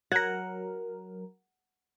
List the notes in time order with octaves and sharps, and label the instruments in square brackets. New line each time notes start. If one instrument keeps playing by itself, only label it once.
[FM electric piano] F#3 A#4 [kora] F#5 [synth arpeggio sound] G#6 A#6